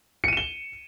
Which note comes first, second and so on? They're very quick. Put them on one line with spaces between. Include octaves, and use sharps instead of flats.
C#7 D#7 E7 G7